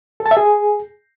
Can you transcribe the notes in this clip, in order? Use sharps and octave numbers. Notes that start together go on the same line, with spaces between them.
A4
A5
E5
G#4